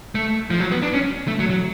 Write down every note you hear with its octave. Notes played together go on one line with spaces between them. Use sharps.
A3
F3
F#3
B3
D4
C#4
A3
F#3
F#3